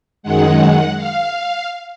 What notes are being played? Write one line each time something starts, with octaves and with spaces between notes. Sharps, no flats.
F#2 D#3 G#3 F#5
F5